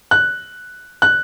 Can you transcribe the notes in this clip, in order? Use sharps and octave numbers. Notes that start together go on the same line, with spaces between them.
F#6
F#6